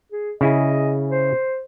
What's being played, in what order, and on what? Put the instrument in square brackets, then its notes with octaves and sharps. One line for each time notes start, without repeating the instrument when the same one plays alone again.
[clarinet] G#4
[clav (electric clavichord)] C#3 E4 G#4 [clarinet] D#5
[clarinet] C5